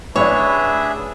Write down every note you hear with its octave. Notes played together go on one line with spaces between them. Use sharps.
A1 D4 G#4 B4 C#5 D5 E5